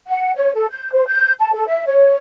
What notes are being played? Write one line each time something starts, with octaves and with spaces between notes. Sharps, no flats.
F#5
C#5
A4
G6
C5
G6
A5
A4
E5
C#5